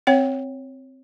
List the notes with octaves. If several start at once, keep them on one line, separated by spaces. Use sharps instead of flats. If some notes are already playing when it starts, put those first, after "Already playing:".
C4 C#5 F#5